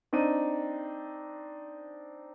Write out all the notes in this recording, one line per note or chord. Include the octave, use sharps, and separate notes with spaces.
C4 D4 D#4 D#7